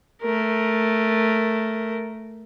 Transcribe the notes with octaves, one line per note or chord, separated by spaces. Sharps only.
A3 A#4